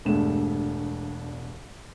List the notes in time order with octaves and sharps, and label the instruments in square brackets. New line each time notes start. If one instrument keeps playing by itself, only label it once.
[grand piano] E1 G2 G#3 A3 B3 E7